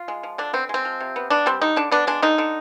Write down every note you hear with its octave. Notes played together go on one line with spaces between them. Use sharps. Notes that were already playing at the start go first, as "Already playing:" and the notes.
Already playing: F4
G#3
F3
D3 D4
B3 C4
G#3 C4
F3
C3
B3
B3 D4
G3 C4
D3 D#4
D3 D4
B3 D4
G#3 D4
D3 D#4
D3